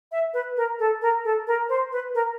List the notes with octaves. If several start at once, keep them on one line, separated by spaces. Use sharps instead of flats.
E5
B4
A#4
A4
A#4
A4
A#4
C5
B4
A#4